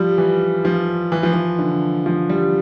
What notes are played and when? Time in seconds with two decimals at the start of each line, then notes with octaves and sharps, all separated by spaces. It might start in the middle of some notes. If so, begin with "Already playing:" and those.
Already playing: F3 G3
0.18 E3
0.65 F3
1.12 E3
1.23 F3
1.34 E3
1.59 D3
2.06 F3
2.29 G3